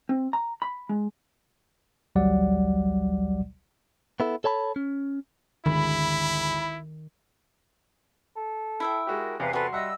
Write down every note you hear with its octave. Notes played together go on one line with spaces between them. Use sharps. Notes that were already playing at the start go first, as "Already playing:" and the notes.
C4
A#5
B5
G#3
A1 D2 F#3 G3 D5 F#5
B3 E4 A4
A4 C#5 A5 B5
C#4
G#1 D2 D#3 G#3 E4 B5
A4
E4 E5 G5
G#3 F#4 G4 A#4
E2 C3 G#4 B4 F5
F#4 A4 B4 C6
G3 D#5 E5 F#5 E6